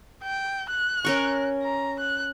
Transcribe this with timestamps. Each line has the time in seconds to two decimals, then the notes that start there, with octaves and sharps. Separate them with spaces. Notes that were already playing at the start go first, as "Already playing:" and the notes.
0.23 G5
0.70 F#6
1.04 C#4 A#4 C#6
1.62 A#5
2.00 F#6